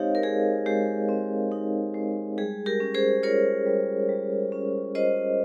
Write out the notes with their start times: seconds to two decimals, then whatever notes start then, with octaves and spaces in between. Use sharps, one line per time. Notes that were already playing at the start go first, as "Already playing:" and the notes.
Already playing: G#3 C4 D#4 G4 C5 C#5 D#5 F5
0.15 A#4
0.23 G#3 G#4
0.66 G#3 G4
1.09 C4
1.52 D#4
1.94 G#3
2.38 G3 G#4
2.66 G4 A#4
2.80 C#4
2.94 G#4 C5
3.23 F4 A#4 C#5
3.66 G3
4.09 G3
4.52 C#4
4.95 F4 C5 D#5